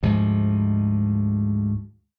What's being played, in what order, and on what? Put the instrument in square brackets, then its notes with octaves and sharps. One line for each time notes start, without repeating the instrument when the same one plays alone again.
[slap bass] D2 G#2 F3